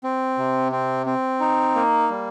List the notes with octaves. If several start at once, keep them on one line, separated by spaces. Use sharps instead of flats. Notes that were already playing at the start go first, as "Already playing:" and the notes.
C4
C3
C4
C4
D#4
A#3
G3